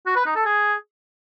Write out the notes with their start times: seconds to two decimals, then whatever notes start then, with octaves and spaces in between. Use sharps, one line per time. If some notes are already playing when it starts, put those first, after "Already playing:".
0.06 F#4
0.16 B4
0.26 D#4
0.36 A4
0.45 G#4